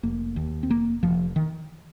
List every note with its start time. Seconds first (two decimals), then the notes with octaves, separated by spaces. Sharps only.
0.03 F1 A#3
0.36 D#2
0.63 C4
0.69 F1 A#3
1.03 F1 F3
1.36 D#3